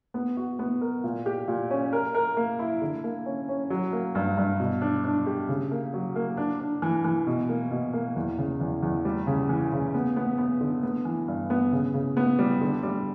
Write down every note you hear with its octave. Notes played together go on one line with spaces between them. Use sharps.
B3
F#4
B3
A#4
A#2
G4
A#2
C#4
A#4
A#4
A#3
E4
D3
A#3
C#4
C#4
F#3
A#3
G2
G2
B2
D4
D4
G4
C#3
A#3
F#3
A#3
D4
D4
E3
E3
B2
A#3
B2
A#3
E2
C#3
E2
E2
G3
C#3
E3
C#3
B3
B3
B3
D3
B3
E3
G2
B3
C#3
C#3
B3
G3
D3
G3